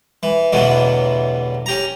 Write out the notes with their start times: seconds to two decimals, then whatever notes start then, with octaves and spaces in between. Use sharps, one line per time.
0.23 E3
0.52 A1 E2 B2 D3 F#3
1.66 C#4 G4 A#5